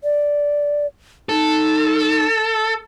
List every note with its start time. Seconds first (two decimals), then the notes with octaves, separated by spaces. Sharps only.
0.04 D5
1.29 D#4 A4